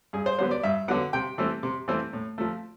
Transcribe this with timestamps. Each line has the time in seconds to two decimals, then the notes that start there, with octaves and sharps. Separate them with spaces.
0.13 G2 G#4
0.26 C5
0.38 D3 F#3 B3 C5
0.51 D5
0.63 G2 E5
0.88 D3 F#3 B3 F#5
1.13 C3 G5
1.38 E3 A3 C4
1.63 C3
1.88 E3 A3 C4
2.13 A2
2.38 F3 A3